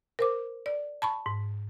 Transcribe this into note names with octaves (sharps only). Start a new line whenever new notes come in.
A#4 C5 D6
D5
A5 B5 C#6
G#2